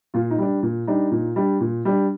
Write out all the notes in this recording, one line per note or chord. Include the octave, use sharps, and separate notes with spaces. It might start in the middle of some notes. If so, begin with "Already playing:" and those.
A#2 F4
D#4
G3 D4
A#2
G3 D4 D#4
A#2
G3 D4
A#2
G3 D4